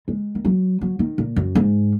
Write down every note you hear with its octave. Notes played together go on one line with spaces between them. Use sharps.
G#3
D#3
F#3
F#3
D#3
A#2
F#2
G#2